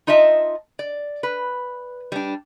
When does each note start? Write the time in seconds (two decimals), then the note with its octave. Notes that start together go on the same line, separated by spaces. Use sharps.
0.07 D#4 F4 D#5 E5 A5
0.79 D5
1.23 B4
2.12 G3 D4